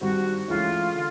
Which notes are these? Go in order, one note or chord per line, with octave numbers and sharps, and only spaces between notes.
G2 D#3 G3 C4 F#4
C#2 C#3 E3 A3 C#4 F4
D3